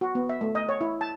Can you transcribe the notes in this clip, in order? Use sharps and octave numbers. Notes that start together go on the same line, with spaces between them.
F#4
B3
E5
A3
D#5
C#5
E4
A5